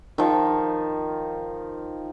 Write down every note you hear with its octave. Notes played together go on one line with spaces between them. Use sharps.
D#3 F3